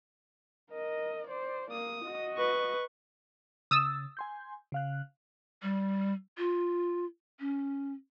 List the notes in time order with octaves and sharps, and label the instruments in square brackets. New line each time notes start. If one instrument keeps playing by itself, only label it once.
[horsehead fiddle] A#4 D#5
C5 D5
[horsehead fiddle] A#3 [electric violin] D#6
[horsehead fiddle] F#4 D#5
[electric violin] B4 C#6
[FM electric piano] C#3 A6 [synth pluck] D#6 E6
[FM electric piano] G#5 C6 G6
C#3 F5 F#6
[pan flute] G3
F4
C#4